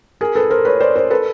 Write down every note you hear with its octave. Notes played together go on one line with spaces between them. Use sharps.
G#4 A#4
A4 B4
A#4 C5
B4 C#5
C5 D5
A#4 C5
A4 B4